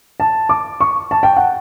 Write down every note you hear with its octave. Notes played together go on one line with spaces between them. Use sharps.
A5
D6
C#6
A5
G5
F#5